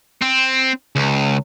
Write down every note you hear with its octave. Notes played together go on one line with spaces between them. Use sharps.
C4
C#2